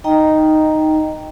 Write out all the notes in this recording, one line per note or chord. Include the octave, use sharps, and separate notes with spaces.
D#4 D#5 G5 A#5